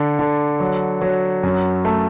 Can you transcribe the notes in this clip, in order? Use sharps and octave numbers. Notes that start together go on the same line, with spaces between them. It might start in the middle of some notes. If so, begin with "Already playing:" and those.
Already playing: D3 D4
D3
F#3
F#3
F#2
A3